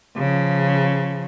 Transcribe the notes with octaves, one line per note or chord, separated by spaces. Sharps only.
C#3 F3